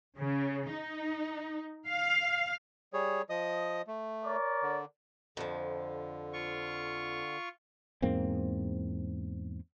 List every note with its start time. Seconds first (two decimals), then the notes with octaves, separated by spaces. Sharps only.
0.18 C#3
0.71 D#4
1.88 F5
2.93 G3 G#4 C#5
3.30 F3 D#5 D#6
3.87 A3
4.24 A#4 C#5 D5
4.62 D3
5.37 F2 D3 F3
6.33 F4 C#6
8.02 E2 G#2 A#3 C4